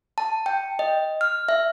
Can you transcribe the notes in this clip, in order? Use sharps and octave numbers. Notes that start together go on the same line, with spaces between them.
A5
G5
D#5
F6
E5